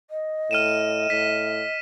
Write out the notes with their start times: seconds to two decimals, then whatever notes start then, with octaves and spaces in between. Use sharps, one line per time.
0.10 D#5
0.51 A2 F6 D#7 E7
1.10 A2 B6